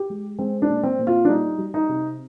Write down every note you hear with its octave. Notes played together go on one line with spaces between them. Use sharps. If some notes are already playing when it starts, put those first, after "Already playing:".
Already playing: G4
G#3
G#3 C4
D4
A#2
C4
A#2
F4
D4
G3 D#4
G3
D#4
C3